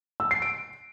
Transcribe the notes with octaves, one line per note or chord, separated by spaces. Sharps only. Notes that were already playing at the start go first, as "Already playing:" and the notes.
E6
C7
D7